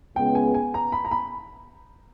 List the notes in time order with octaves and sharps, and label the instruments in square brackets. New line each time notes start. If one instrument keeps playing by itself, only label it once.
[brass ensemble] C#2 C#3 G#3 B3 [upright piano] G5
[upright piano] G#5
G#5
A#5
B5
A#5
B5